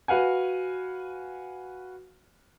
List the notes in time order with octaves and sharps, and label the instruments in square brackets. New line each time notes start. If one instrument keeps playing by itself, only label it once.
[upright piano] F#4 B4 F5 F#5 G#5